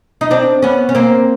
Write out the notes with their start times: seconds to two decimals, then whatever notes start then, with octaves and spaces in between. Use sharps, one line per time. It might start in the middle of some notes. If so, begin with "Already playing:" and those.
0.21 D#4
0.31 C4 D4
0.62 B3 C#4
0.89 C#4
0.95 A#3 C4